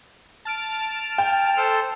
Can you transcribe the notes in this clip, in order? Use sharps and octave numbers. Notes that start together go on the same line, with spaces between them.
A5 F6 D7
G5
A4 C5